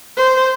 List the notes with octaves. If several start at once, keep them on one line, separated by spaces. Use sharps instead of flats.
C5